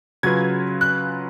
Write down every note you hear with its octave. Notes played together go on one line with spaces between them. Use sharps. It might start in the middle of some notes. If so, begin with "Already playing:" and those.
C#3 F#3 C#4 F4 B4 G#6
F#6